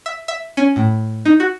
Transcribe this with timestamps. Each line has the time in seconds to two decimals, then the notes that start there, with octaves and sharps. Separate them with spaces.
0.06 E5
0.28 E5
0.57 C#4
0.76 A2
1.25 D#4
1.40 F#4